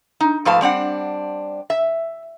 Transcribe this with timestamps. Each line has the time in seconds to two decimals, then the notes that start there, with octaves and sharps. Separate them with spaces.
0.21 D#4
0.45 G#2 F3 A3 B4 F5 A5
0.61 G3 C4 D4 F#5
1.70 E5